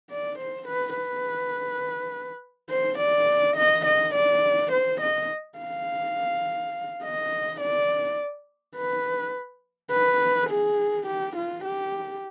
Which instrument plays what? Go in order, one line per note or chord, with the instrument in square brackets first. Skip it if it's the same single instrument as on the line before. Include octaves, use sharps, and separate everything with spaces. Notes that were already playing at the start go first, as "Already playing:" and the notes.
[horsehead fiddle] D5
C5
B4
B4
C5
D5
D#5
D#5
D5
C5
D#5
F5
D#5
D5
B4
B4
G#4
G4
F4
G4